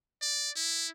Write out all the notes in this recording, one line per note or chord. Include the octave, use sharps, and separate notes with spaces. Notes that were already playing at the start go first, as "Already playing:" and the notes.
D5
E4